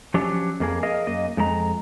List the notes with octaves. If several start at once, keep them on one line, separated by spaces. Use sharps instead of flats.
F3 F#3 C#4 D4 G4
F2 A#3 G#4
G#4 A#4 D#5 F5
F#2 A#3 D#5
F2 G#3 F#4 A#5